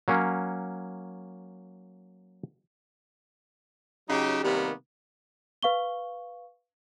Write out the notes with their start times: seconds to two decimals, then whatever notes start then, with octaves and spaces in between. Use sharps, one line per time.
0.08 F#3 A#3 C#4
4.09 C#3 F#3 D#4 G4
4.43 C3 D#3 G3 A#3 B3
5.63 B4 F5 C#6 G7